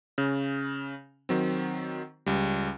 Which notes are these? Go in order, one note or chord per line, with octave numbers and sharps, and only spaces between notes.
C#3
D#3 F#3 C4
C#2 G3